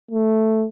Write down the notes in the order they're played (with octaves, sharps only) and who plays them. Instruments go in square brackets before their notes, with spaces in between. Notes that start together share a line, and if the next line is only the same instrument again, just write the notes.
[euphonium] A3